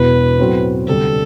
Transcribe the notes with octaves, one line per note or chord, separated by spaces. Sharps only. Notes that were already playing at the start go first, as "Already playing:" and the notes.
Already playing: E1 E2 B2 B4
A2 F#3 C4 F#4
D2 C3 G3 D4 A4